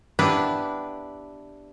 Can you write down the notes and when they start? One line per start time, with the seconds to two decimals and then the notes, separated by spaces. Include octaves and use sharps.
0.19 B3 D4 E4 G4 B4